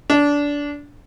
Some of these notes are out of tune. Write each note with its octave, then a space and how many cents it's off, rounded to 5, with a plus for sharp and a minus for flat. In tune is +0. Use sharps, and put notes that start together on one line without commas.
D4 -20